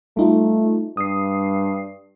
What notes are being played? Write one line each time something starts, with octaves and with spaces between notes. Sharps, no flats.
G3 A3 D#4 F4
G2 D#6 C7